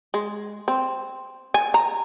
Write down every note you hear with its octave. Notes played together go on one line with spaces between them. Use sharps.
G#3
C4
G#5
A#5